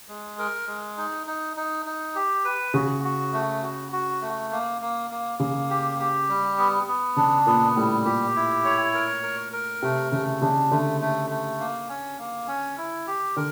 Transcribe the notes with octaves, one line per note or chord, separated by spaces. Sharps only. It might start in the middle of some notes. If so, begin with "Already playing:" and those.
G#3
A#4
G#3
D#4
D#4
D#4
D#4
G4
B4
C#3 F#4
F#4
A3
F#4
F#4
A3
A#3
A#3
A#3
C#3 A#3
G4
G4
G3
B3
B3
C#3 D4
A#2 B3
A2 G3
A#2 G4
E4
C#5
A#4
A#4
A#4
C3 A3
C#3 A3
C#3 D4
D3 A3
A3
A3
A#3
C#4
A#3
C#4
E4
G4
D3 A#4